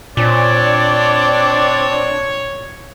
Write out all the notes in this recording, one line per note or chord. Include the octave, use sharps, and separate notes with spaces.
A#2 C4 D4 C#5 D5